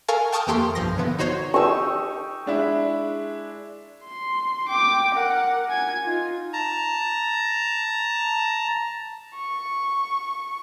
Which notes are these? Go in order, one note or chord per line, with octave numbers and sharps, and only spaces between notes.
A4 A#4 F5 G#5 C#6 A6
G5 A5 C#6 D#6 F6 G6
F2 E3 A#3 G4 A4 C6
B1 G2 F3 C6 A#6
D3 E3 B3
D#4 F#4 C5 C#5
D#4 G4 C#6 E6
G#3 D4 E4
C6
G5 D6
A#4 F#5
G#5 G#6
D#4 F4
A5 A#5
C#6